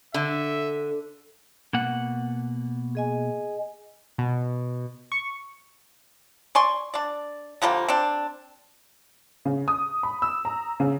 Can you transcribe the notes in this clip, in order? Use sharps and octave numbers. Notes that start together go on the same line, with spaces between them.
D3 E5
B2 A#3 F#5
G#4 D#5 G#5
B2
C#6
D5 G#5 C6 C#6
D4 D5
D3 F3 G3 A#3
C4 D4
C#3
D#6
B5
E6
A#5
C#3